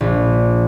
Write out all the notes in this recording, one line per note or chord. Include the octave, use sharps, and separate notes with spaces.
A#1